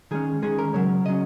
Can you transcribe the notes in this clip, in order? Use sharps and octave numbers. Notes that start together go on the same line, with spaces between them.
D#3 G#3 C#4 G#4
D#3 G#3 C#4 G#4
A#4
C#3 F#3 C#4 C#5
C#3 F#3 C#4 D#5